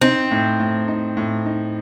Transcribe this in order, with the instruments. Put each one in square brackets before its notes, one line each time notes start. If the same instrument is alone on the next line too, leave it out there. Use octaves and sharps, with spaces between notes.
[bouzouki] C4 [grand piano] D#4
[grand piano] A2
A2
D#4
A2
D#4